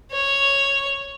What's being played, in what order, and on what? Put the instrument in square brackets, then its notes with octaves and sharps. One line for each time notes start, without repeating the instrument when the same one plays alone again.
[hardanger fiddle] C#5